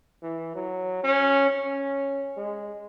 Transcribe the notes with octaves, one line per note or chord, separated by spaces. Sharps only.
E3
F#3
C#4
C#4
G#3